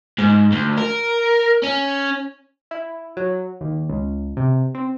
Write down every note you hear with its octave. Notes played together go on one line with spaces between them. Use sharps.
G#2
D2
A#4
C#4
E4
F#3
D#2
C#2
C3
C4